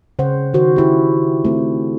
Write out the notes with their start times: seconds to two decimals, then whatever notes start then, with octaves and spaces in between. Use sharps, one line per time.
0.19 C#3 C5 F#5
0.54 D#3 F#4 C5
0.76 E4 G4
1.45 A3 C4